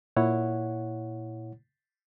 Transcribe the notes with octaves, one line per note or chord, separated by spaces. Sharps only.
A#2 E4 C#5 F#5